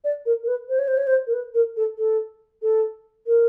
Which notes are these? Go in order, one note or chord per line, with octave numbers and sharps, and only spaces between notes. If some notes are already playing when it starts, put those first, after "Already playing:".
D5
A#4
A#4
B4
C5
C#5
C5
C#5
C5
A#4
B4
A#4
A4
A4
A4
A#4